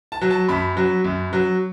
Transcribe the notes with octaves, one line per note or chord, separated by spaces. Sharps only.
A5
F#3
A5
F#2 B5
F#3
F#2
F#3